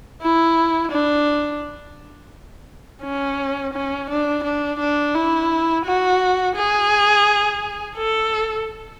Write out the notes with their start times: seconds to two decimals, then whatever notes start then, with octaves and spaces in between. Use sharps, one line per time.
0.22 E4
0.92 D4
3.03 C#4
3.74 C#4
4.10 D4
4.44 D4
4.79 D4
5.15 E4
5.85 F#4
6.56 G#4
7.96 A4